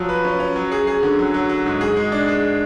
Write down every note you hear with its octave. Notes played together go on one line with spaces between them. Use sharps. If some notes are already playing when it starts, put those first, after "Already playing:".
Already playing: F3 F#3
B4
C#4
C#4
F#3
G#4
G#4
D3
F#3
F#3
F#3
G#2
G#4
G#3
D4
G#4